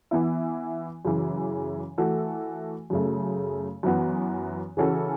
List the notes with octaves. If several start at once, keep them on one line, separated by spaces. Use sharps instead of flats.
E3 B3 E4
F#2 C#3 E3
E3 A3 F#4 A4
F#2 C#3 A3
F#2 E3 B3 F#4
C#3 E3 C#4 F#4 A4